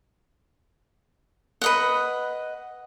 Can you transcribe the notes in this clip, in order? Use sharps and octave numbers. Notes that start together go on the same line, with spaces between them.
B4 D#5 F#5